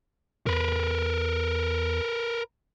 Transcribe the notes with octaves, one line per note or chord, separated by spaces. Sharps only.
E2 A#4 B4